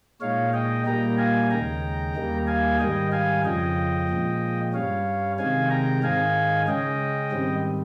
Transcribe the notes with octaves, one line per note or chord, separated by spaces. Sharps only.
A#2 G#3 D#4 C#5 F5
D#5 G5
A#2 G3 A#3 D#4 G5 A#5
F5 G#5
D#2 C#3 G#3 D#4 G5 A#5
D#2 D#3 G3 A#3 D#4
F5 G#5
G#2 D#3 G3 D#5 G5
F5 G#5
F2 C#3 F3 D#5 G5
A#2 F3 G#3
G2 G3 C#4 C#5 F5
C3 D#3 G#3 C4 D#4 F5 G#5
G5 A#5
G#2 D#3 G#3 D#4 F5 G#5
C#3 G#3 C#4 D#5 G5
G#2 D#3 G3 C4